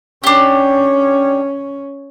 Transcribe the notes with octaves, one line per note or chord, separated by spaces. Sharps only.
C#4 D4 G4